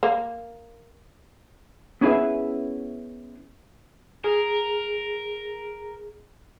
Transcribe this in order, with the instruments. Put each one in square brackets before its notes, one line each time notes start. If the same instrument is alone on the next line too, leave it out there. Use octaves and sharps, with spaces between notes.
[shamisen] A#3
[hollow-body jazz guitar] B3 C#4 E4 G#4 B4 E5
[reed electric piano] G#4 [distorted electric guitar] A#4